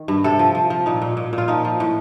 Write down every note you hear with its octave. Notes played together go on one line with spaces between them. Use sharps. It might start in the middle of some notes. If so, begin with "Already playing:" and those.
Already playing: D#3
G2
C3 A4
F3
F3
F3
A#2 D#4
A#2
A#2
A#2
F4
F3 D#4
F3
A2